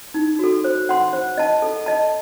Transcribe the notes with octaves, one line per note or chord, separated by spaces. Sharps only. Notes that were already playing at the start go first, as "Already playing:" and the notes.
D#4
F#4 A4
C5
F#5 C6
C5
D#5 A5
A4
D#5 A5